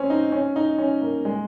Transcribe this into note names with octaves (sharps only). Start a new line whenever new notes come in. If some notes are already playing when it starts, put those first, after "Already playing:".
Already playing: C4 C#4
D#4
C#4
D#4
C#4
A#3
G#3